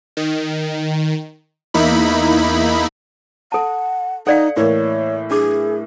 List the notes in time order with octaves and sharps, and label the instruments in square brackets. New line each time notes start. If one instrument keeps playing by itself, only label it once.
[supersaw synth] D#3
E2 A#3 D#4 E4 B5
[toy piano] A4 A5 [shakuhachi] F#5
[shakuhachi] D#4 [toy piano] A4 D5 F5 [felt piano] F#5
[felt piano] A2 E3 A#3 [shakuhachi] C#5
[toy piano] D4 D6 [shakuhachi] G#4